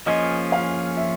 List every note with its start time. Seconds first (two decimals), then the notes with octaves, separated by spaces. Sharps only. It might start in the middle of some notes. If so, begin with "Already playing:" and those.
0.06 F3 A#3 C#4 F4 G#4 D#5
0.52 F5
0.97 E5